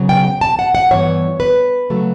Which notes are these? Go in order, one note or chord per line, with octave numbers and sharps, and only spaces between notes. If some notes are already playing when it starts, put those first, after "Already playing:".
Already playing: C#3 F#3 B3
G5
G5
A5
F#5
F#5
G2 E3 B3 C#5
B4
C#3 F#3 A3